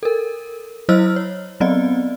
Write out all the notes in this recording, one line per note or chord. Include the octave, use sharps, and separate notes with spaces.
A4 A#4
F#3 E4 C5 D#5 E6 F6
C#5
F#3 B3 C4 D5 D#5